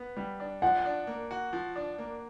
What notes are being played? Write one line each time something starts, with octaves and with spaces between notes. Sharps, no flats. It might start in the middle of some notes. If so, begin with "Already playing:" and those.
Already playing: B3
G3
D4
F3 F#5
D4
A#3
F#4
F3
D4
A#3